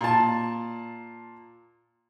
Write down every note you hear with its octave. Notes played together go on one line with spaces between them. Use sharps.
A#2 A5